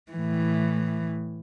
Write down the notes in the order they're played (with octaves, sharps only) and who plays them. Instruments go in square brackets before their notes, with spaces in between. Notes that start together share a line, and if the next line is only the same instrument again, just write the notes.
[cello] A2 E3